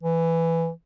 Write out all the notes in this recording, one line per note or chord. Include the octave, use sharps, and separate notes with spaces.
E3